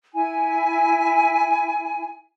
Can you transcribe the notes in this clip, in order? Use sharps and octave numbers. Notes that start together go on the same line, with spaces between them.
E4 G#5